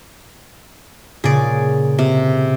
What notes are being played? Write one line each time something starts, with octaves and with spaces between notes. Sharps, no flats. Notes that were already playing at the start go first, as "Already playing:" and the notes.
A#2 C#3 G#4 D5
C3